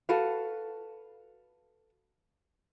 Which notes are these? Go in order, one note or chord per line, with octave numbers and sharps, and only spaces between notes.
F#4 A4 B4 F5